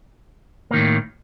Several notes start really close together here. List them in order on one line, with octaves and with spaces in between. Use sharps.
A#3 D#3 A2